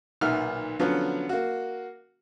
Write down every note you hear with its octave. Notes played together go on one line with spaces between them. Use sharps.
B1 A#2 D#3 E5 F#5 F6
D3 F3 F#3 B3 C#4
A#3 F#4